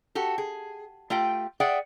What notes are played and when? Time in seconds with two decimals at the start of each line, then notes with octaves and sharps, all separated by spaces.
0.15 F#4 G4 A4
0.38 G#4
1.10 A3 F4 G4 G5
1.60 G#4 D5 E5 F#5 G5